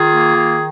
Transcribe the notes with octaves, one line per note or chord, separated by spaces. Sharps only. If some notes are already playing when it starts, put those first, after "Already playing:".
Already playing: D#3 F4 G#4
A#3
D#3